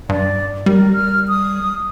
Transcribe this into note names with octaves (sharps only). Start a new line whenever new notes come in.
G2 D5
G3 A#4
F6
D#6